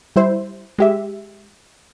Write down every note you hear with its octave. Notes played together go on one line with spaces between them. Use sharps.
G3 E4 C5
G#3 G4 E5